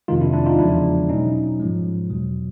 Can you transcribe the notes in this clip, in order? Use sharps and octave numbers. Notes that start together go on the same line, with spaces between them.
F2 C3 D#3 G#3 D#4 F4
D4 E4
D4 E4
D#4 F4
E2 C#3 F3 G#3 D4 E4
B2 F#3 C#4 D#4
G#2 F3 G#3
E2 B2 F#3